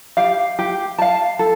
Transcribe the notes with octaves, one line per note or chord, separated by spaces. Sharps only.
G4 F5
G4
F5 A5
A4